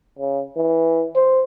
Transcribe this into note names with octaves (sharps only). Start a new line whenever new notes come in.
C#3
E3
C5